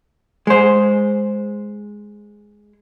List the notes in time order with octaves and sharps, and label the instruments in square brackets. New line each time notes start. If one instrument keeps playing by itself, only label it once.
[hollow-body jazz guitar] G#3 C5